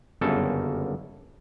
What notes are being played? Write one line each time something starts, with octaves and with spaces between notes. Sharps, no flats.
G1 F#2 C#3 A#3 A4